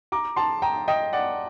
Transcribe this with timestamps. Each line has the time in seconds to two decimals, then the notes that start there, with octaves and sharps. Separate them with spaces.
0.12 A#5 D6
0.36 A5 C6
0.62 G5 A#5
0.88 D#5 G5
1.13 D5 F#5